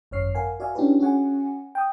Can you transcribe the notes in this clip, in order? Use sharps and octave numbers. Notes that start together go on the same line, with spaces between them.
G#1 F#2 C#5 F6 C7
A#4 F5 F#5 G#5
F#4 D5 E5 F5 G#5
C#4 D4 E4 F#4 G4 B4
C#4 F#4 G#4 F#5 G#5
G5 D#6